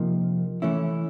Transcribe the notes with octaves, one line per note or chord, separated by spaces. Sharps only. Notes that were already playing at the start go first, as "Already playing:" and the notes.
Already playing: C3 F3 A#3 D#4
E3 A3 C#4 E4